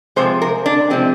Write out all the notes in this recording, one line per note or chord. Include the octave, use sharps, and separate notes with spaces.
C3 F3 G#3 C5
A#4
D4
C3 F3 G#3 C4